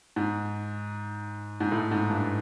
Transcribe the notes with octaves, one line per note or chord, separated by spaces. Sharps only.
G#2
G#2
A2
G#2
G2